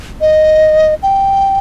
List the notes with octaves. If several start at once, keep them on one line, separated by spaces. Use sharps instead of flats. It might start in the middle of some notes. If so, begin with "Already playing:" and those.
D#5
G5